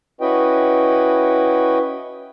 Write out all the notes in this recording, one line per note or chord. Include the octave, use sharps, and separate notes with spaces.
C#4 E4 F#4 B4 D#5 G5